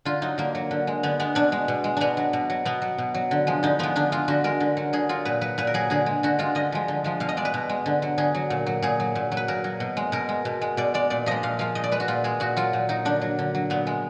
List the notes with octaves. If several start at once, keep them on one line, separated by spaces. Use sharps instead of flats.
D3 F4
F#3 D#4
D3 A#3
F#3
D3
G#3
D3 B3
G#3 B3
B2 D4
G#3
B2
G#3
B2 B3 D4
F#3
B2
F#3
B2 B3
F#3
B2
F#3
D3
F3 G#3
D3 D#4
F3 G#3 B3
D3 D4
G#3 F4
D3 F#4
G#3 A#4
D3
F#3
D3 G#4
F#3 F4
A#2 B4
F#3 B4
A#2 B4
A#4
F#3 G#4
D3 G#4
G#3
D3 F#4
G#3 F4
D3 D#5
F3 G#3
D3
F3 G#3
B2 F5
D#5
G#3 D5
B4
B2
G#3
D3
F#3
D3 G#4
F#3
A#2
F#3
A#2 G#4
F#3
A#2
F#3
B4
A#2 A#4
F#3
B2
G#3
B2 A#4
G#3
B2
G#3
B2 D5
G#3 D5
A#2 D5
F3 G#3 D#5
A#2 F5
F3 G#3 F5
A#2 D#5
D5
G#3 B4
F#4
A#2 F4
G#3 G#4
A#2 F#4
F#3 F4
A#2
F#3 D#4
D3 D4
F#3
D3
F#3
A#2 B3
G#3